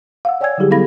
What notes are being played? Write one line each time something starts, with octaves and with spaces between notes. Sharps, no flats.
F5 F#5 E6
C#5 D5 G5 G#5 E6 G#6
D3 F#3 G3 E4 G4 G#4
B3 E4 A4 F5 B5 A#6